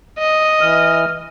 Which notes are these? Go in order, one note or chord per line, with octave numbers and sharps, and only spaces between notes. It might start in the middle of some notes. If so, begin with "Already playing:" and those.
D#5
E3 F6